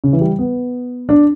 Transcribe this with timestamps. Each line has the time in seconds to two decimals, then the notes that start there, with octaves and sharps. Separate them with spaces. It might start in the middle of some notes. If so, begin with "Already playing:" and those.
0.04 C#3
0.13 E3
0.21 G3
0.39 B3
1.09 D4